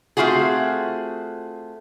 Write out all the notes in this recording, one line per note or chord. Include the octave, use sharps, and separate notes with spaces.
A3 C4 F4 F#4 G#4